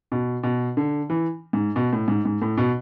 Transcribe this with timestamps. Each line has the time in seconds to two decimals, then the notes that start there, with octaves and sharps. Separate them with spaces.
0.12 B2
0.43 B2
0.77 D3
1.10 E3
1.53 G#2
1.76 B2
1.93 A2
2.08 G#2
2.25 G#2
2.42 A2
2.57 B2